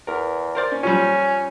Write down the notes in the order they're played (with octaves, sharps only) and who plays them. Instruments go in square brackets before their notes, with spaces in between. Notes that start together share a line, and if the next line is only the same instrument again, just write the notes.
[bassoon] E2 [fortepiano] A#4
[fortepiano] A#4 C5 D5
C#4
[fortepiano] A#2 F3 G3 [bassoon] C#4